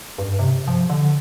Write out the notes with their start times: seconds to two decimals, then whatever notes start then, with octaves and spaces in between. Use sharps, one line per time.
0.18 G2
0.39 C3
0.68 F3
0.90 D3